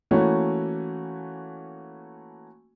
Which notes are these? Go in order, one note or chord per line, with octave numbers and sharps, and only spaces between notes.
E3 A3 A#3 C#4 F#4